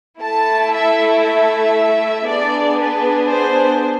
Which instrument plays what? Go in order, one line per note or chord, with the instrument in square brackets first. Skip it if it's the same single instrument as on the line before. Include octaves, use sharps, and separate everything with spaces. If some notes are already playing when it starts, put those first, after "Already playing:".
[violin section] A3 E4 A4 A5
E5
E5
B3 D4 G#4 D5
B4
C5